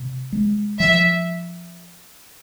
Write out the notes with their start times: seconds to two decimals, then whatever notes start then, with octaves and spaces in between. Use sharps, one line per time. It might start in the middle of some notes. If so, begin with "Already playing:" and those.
Already playing: C3
0.32 G#3
0.79 F3 E5